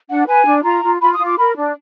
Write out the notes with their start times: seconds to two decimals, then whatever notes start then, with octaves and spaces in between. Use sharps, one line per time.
0.10 D4 F#5
0.27 B4 G#5
0.46 D4
0.64 F4 A#5
0.83 F4
1.01 F4 B5
1.13 D#6
1.19 F4
1.25 D6
1.38 A#4 B5
1.56 D4